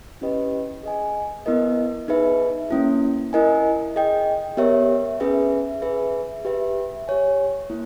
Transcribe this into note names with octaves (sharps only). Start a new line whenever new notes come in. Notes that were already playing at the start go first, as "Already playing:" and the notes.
C#4 E4 G4 B4 D#5
G#4 D#5 G#5
B3 E4 A#4 D#5
D#4 G#4 B4 E5
A#3 C#4 E4
E4 A#4 D#5 G#5
G#4 D#5 G5
B3 G4 A#4 C#5 E5
C#4 G#4 B4 E5
G#4 B4 E5
G4 B4 E5
G4 C#5 G#5
A#3 E4